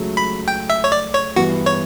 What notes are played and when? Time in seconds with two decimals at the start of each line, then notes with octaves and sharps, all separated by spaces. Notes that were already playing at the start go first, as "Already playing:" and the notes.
Already playing: C#2 C#3 F#3 A3
0.17 B5
0.48 G5
0.70 E5
0.84 C#5
0.92 D5
1.14 C#5
1.36 G2 E3 B3 F#4
1.66 C#5